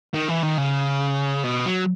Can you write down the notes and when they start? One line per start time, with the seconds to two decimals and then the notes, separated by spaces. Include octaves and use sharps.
0.14 D#3
0.28 E3
0.43 D#3
0.58 C#3
1.44 B2
1.66 F#3